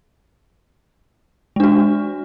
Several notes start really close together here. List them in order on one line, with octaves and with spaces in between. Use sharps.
G#3 D4 F#4